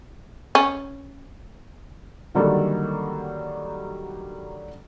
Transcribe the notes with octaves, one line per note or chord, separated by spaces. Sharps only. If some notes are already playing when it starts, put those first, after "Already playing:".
C#4
D3 D#3 F#3 G3 A#3 A4